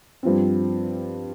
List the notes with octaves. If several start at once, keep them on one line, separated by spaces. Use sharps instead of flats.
G2 F3 C4